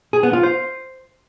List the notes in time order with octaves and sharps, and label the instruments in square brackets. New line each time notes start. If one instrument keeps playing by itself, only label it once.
[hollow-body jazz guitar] G#4
B3
F4
C5